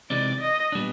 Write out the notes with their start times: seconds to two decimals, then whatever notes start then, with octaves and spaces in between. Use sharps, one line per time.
0.10 C3 E3 G#3 C4 D#4 D5
0.41 D#5
0.72 A#2 G3 B3 D4